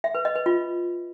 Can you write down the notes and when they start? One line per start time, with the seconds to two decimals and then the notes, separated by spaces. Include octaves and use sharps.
0.04 E5
0.15 B4
0.25 D#5
0.35 B4
0.46 F4